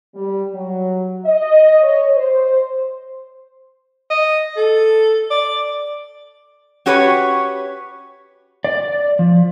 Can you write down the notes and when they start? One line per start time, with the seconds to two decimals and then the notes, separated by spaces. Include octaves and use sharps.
0.15 G3
0.54 F#3
1.26 D#5
1.82 C#5
2.15 C5
4.11 D#5
4.57 A4
5.31 D5
6.86 C#4 F#4 G4 B4 C#5
8.65 D5
9.19 F3